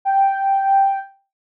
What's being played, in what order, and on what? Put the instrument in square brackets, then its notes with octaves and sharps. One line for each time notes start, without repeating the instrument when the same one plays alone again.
[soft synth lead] G5